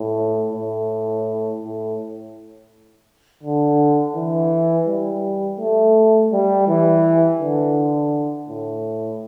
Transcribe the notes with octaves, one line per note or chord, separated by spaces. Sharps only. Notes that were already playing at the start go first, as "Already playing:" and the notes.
Already playing: A2
A2
A2
D3
E3
G3
A3
G3
E3
D3
A2